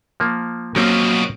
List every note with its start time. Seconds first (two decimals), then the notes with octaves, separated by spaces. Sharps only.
0.20 F3 A#3
0.76 B2 F3 F#3 A#3 C4 C#4 A#4